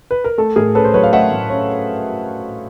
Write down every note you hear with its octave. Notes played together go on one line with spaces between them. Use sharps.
B4
A#4
A3 A4
A2 G#4 A#4
C#4 A4 B4
C5
F#3 B4 C#5
F5
A3 E5 F#5
A2
C#4